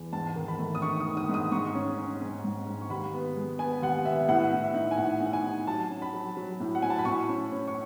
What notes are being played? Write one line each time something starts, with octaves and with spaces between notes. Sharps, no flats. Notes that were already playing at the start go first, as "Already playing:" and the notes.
Already playing: E2
G#2 A5
D#3
B5
A3
D#6
D#4 C#6
D#6
D#3
D#6
G#2 D#6
G#2 C#6
C#4
C#4
G#2
G#2
G#2
C#6
D#2 B5
B3
G#3
B3 G#5
D#2 F#5
B3 E5
A2 F#5
A2
E5
D#4
G#5
A2 F#5
D#4
F#5
G#5
D#4
F#3 A5
C#4
B5
F#3
F#3
A2
F#5
A2 G#5
A5
B5
A2 C#6
C#4
C#4
C#6